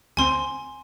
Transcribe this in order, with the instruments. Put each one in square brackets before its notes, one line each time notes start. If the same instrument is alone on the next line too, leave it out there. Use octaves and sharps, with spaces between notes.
[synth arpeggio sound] D2 C4 [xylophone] G#5 C6